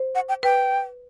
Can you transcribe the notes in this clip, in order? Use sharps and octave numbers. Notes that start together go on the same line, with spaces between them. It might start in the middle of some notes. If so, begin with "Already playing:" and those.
Already playing: C5
F#5
G5
B4 G5